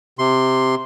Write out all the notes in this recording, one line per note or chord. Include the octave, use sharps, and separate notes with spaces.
C3 C6